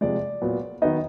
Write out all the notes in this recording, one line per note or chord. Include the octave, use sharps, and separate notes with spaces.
C3 F3 G#3 D5
A#2 F#3 B3
D#3 F#3 B3 D#4 D#5